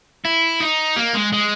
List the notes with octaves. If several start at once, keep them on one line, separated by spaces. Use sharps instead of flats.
E4
D#4
A#3
G#3
G#3